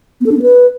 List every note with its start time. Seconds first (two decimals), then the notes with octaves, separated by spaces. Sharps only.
0.21 B3
0.26 A4
0.31 D4
0.37 B3
0.42 B4